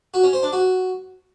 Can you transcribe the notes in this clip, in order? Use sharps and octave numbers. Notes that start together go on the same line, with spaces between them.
F#4
C#4
C5
D4
F#4